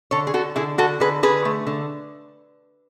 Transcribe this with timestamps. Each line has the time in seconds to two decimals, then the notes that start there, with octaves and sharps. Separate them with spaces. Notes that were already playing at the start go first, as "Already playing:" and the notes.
0.11 D3 A4 C#5
0.27 G#4
0.34 D3 F#4 A4
0.56 D3 E4 G#4
0.78 D3 F#4 A4
1.00 D3 G#4 B4
1.23 D3 G#4 B4
1.45 A3
1.67 D3